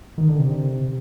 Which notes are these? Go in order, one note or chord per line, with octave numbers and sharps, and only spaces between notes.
D#3
D3
C3